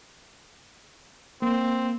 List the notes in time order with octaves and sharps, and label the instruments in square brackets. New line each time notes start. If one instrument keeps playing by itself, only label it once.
[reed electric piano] A#3 [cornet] C4